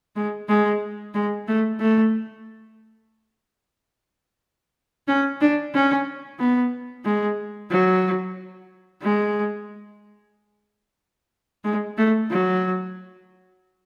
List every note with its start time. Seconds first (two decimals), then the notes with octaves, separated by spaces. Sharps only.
0.16 G#3
0.49 G#3
1.14 G#3
1.47 A3
1.80 A3
5.08 C#4
5.41 D4
5.74 C#4
6.39 B3
7.05 G#3
7.71 F#3
9.02 G#3
11.64 G#3
11.98 A3
12.30 F#3